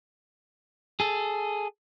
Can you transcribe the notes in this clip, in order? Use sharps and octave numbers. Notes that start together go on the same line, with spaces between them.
G#4 A4